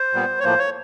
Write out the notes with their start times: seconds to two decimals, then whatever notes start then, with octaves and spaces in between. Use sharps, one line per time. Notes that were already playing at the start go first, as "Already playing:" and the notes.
Already playing: C5
0.13 A#2 G3 B3
0.40 C#5
0.44 A2 F3 A#3 C5
0.59 C#5